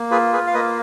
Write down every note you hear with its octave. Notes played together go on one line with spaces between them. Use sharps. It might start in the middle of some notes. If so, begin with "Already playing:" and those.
Already playing: A#3
F4 G#4 B4
G#4 B4
F5
A#3 B4 D#5